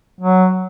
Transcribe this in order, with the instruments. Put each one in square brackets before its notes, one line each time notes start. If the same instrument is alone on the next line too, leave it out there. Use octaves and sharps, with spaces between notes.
[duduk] F#3